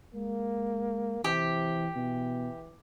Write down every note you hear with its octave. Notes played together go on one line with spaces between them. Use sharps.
G#3 A#3
C3 E3 G4
B2 E3